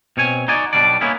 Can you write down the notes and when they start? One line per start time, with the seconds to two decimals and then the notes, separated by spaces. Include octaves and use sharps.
0.17 B2 C4 C#5 G#5
0.48 D#4 F#4 D5 G#5
0.73 B1 F#2 B2 G3 D4 D5
1.01 A#3 B3 C#4 D#4 E4